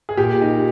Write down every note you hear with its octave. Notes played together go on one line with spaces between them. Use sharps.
G#4
A#2 G4
D#4